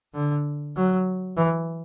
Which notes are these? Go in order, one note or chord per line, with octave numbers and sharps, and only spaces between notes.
D3
F#3
E3